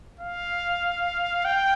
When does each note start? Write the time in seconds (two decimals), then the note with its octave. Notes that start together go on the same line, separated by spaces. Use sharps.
0.20 F5
1.45 G5